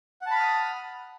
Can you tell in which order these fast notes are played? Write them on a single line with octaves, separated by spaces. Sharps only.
F#5 A5 B5 F6 D#6